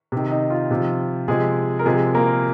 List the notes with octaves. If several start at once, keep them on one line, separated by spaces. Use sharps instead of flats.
C3 D#3
D#4
F4
C3 F3
C3 F3 G#3 G#4
A#4
C3 F3 G#3 G#4
A#3 A#4